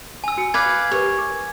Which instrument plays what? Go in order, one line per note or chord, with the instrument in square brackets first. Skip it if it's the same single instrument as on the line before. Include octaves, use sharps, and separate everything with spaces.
[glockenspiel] G#5 E6
[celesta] F#4 C#7
[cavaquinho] B4 D5 F5 [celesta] B5 D6 F#6 [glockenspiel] G#6
[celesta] G4 A#4 B4 [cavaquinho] C#5
[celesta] D6